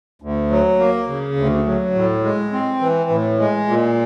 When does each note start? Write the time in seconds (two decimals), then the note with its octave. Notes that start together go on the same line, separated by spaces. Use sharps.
0.22 D2
0.50 F#3
0.79 A#3
1.08 C#3
1.37 D2
1.66 F#3
1.95 A2
2.24 G#3
2.53 C4
2.81 E3
3.10 A2
3.39 G#3
3.68 A#2